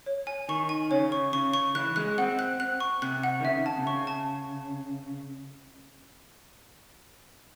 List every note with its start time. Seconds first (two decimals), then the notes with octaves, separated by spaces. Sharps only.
0.06 C#5
0.27 G#5
0.49 D#3 C#6
0.69 G#5
0.91 C#3 C#5
1.12 C#6
1.33 C#3 C#6
1.54 C#6
1.75 E3 F#6
1.96 G#3 F#6
2.18 C4 F#5
2.39 F#6
2.60 F#6
2.80 C#6
3.02 C3 F#6
3.23 F#5
3.40 D#3
3.44 C#3 E5
3.66 A5
3.78 C3
3.87 C#3 C#6
4.07 A5